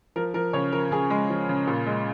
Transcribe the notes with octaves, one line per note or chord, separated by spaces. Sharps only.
F3 A#4
F3 A#4
C#3 C#5
F3 A#4
C#3 G#4
G#3
F3
C#3
A#2
G#3